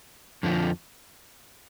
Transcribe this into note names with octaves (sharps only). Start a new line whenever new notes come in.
F2 D3 F3